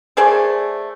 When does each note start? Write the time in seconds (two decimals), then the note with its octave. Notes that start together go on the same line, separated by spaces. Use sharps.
0.17 A3 G#4 C5 D5